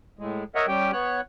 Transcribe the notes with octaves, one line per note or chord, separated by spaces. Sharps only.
A2 G#3
A#4 C#5 D#5 E5 F#5
G3 C#4 G4 G5
B3 C#5 F#6